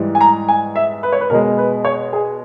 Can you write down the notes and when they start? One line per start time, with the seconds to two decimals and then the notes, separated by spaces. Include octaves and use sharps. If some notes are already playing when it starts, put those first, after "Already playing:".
Already playing: G#2 E3 G3
0.15 G#5
0.21 A#5
0.48 G#5
0.76 E5
1.03 B4
1.12 C#5
1.21 B4
1.30 B2 G#3 A#4
1.58 B4
1.85 C#5
2.13 G#4